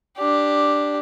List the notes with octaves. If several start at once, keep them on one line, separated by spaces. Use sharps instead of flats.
D4 G4